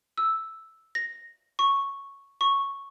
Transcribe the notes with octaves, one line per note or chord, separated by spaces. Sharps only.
E6
A#6
C#6
C#6